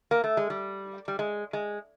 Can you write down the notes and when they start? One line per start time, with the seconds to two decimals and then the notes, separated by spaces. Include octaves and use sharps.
0.11 A#3
0.24 A3
0.37 G#3
0.50 G3
1.08 G3
1.19 G#3
1.53 G#3